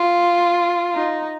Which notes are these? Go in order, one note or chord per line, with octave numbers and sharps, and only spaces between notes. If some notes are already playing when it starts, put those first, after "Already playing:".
Already playing: F4
D#4